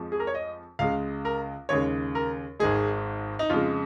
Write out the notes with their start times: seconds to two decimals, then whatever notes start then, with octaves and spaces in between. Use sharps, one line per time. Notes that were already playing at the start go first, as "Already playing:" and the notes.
Already playing: F2 F3 G#3
0.12 G#4
0.20 A#4
0.27 C#5
0.35 D#5
0.79 C#2 C#3 G#3 F5
1.25 A#4
1.69 D#2 C#3 G#3 C#5
2.15 A#4
2.59 G#1 G#2 D#3 G#3 G#4
3.39 D#4
3.50 F2 C#3 G#3 F4